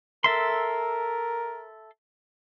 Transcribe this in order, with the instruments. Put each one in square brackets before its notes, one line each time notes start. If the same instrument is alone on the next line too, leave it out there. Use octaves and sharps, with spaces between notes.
[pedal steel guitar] A4 E5 C6 [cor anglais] A#4